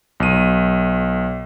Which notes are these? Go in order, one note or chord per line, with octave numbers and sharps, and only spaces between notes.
B1 D#7